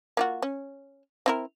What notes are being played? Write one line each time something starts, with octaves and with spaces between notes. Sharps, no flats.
A#3 F4 F#4
C#4
C4 E4 A#4